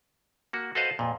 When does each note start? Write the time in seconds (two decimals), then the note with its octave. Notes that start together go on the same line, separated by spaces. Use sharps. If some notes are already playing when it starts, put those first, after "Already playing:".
0.53 A#3 F#4
0.75 F#4 A4 B4 C5 D#5 F5
0.99 F2 A#2